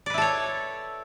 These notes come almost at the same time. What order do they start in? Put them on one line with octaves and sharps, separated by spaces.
D5 B4 E4 A4 C#5